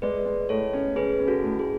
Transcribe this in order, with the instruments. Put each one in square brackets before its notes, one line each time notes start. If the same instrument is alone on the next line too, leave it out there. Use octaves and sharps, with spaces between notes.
[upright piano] G#3 [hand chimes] B4 D5
[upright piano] G#3
[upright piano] A2 [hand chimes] A4 C#5
[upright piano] C#4
[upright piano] C#4 [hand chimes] G#4 B4
[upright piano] C#4
[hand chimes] F#4 A4
[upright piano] A2
[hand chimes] G#4